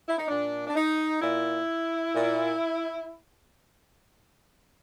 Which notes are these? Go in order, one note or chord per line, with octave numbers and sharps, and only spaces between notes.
E4
D#4
A#2 D4
D4
D#4
A#2 E4
A#2